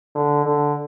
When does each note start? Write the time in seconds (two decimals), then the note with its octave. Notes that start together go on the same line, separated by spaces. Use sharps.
0.15 D3
0.45 D3